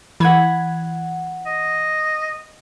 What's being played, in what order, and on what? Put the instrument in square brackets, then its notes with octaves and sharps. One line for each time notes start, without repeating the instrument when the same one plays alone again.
[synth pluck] E3 G#6 [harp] F#5 B5
[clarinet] D#5